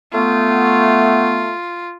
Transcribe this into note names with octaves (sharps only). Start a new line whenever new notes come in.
A3 B3 F4